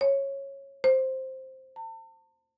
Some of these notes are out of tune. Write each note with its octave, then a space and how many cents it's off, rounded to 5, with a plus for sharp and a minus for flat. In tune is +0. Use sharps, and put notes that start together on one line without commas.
C#5 -15
C5 +5
A5 +40